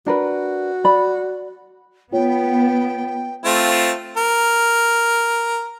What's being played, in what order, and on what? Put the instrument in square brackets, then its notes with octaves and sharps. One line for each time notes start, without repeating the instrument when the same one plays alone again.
[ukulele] D4 A#4 B4 [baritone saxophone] F#4
[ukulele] D5 B5
[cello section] B3 [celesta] F4 C#5 [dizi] G5
[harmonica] A3 C4 F4
A#4